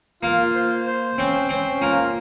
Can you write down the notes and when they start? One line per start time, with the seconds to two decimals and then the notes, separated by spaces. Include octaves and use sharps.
0.22 A#3 F4
0.55 C5
0.86 C5
1.18 C4 C#4
1.49 C4 C#4
1.81 A#3 F4